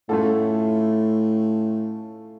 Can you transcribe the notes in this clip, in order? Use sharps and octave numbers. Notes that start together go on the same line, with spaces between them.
A2 A3 C#4 F4 A4